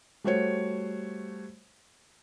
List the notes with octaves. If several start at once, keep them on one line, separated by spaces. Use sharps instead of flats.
G3 A3 F#4 C5 C#5